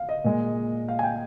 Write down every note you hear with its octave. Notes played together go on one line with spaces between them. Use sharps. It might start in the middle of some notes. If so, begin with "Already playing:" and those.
Already playing: F5
D#5
A#2 G#3
F5
G#5
G5